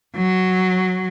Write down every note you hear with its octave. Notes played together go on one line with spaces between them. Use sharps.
F#3